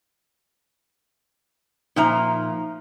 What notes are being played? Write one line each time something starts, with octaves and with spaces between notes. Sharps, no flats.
A#2 F3 D#4 E5 A#5